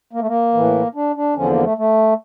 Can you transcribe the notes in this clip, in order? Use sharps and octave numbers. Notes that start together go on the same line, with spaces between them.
A#3
A3
A#3
A2 E3
D4
D4
E2 D3 F3 C#4
A#3
A3
A3